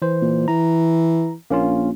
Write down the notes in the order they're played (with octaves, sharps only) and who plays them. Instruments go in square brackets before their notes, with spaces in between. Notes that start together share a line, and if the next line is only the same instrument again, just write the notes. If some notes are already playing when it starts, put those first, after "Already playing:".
[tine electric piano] E3 C5
[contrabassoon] A#2
[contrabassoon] E3 [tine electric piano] A#5
[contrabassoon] A#1 [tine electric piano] A#3 C#4 F4